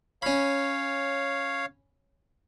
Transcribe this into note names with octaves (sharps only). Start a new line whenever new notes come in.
C#4 C#5 F5 B5